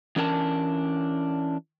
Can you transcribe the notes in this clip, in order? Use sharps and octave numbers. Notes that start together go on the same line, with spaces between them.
E3 C#4 D4 A#4 G5 A5